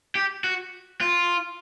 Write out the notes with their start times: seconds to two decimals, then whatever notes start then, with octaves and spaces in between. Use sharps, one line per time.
0.15 G4
0.44 F#4
1.01 F4